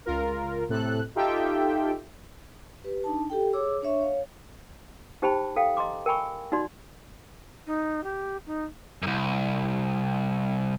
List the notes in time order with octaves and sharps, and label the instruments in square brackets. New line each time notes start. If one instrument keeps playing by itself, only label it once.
[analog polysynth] C#2 F4 A#4
A2 C3 A4 F#6
D#4 F4 G4 A4 E5 G5
[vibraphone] G4 B4
D4 D#4 A5
G4 A4 G5
G#4 C#5 D6 E6
D4 C#5 E5 C#6
C#5 F5
[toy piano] D#4 G4 C5 G5 A5 B5
A4 F5 G5
D#5 A#5 C6 D6
A#4 G5 G#5 B5 C#6
D#4 F#4 D5 C6
[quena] D#4
G4
D#4
[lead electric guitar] C2 F#2